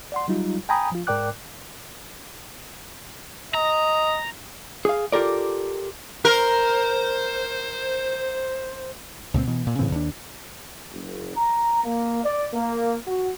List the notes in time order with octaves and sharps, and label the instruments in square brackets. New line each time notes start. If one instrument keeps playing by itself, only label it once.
[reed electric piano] D5 F#5 C6
F#3 G3 D#4 F4
G5 G#5 A#5 B5 D#6
F3 F4
G#2 A#4 D5 G5 D6 F#6
[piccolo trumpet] D#5 [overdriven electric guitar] A#5
[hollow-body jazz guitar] G#4 F5
F4 G4 A4 A#4 D5
[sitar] A#4 [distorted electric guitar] C5
[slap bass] C#2 A#2 A3 C4
B2 E3
A#2
A2 C#3 E3 C4
D#2 D4
[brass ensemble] F#1
A#5
A#3
D5
A#3
F#4